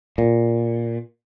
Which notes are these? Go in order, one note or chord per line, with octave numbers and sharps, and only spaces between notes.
A#2